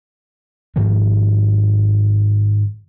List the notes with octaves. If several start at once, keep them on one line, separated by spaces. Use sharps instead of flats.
G#2 D#3 F3 A#3